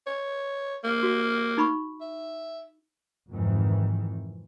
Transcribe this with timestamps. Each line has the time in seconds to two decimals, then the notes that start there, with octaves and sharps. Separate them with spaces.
0.07 C#5
0.84 A#3
1.03 F#4
1.58 D#4 B5 C#6
2.01 E5
3.31 F2 G#2 C3 D#3 E3